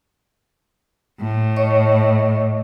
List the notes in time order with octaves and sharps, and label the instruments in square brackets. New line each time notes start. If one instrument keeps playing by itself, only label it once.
[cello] A2
[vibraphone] C#5 D#5 C#6